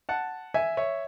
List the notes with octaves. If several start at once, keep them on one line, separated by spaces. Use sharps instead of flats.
F#5 A5
E5 G#5
C#5 E5